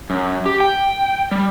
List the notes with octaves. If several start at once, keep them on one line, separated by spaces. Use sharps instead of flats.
F#2
G4
G5
G3